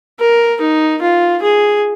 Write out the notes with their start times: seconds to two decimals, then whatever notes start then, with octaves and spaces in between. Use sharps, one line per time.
0.19 A#4
0.61 D#4
1.01 F4
1.42 G#4